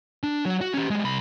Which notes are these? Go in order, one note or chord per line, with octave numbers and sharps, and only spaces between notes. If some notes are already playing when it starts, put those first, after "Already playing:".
D4
F#3
F#4
C#4 G4
G3 G#3
C2 B5